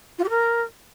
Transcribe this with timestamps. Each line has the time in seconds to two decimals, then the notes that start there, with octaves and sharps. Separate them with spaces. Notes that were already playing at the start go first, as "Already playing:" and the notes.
0.18 F4
0.24 G4
0.29 A#4